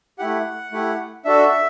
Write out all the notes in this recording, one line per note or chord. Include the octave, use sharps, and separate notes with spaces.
A3 E4 G4 F#5
A3 E4 G4
D4 F#4 A4 E5